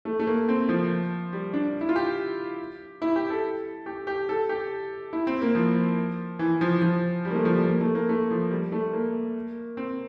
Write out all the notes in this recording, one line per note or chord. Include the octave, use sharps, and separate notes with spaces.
A3
A3
A#3
C4
F3
G3
D4
E4
F4
G4
E4
G4
A4
G4
G4
A4
G4
E4
C4
A#3
F3
E3
F3
F3
G3
A#3
A3
F3
G3
A#3
A3
A#3
A3
F3
G3
A3
A#3
C4